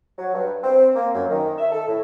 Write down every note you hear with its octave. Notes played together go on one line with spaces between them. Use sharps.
F#3
G2
C4
A#3
F#2
D#3
E5
A4
A2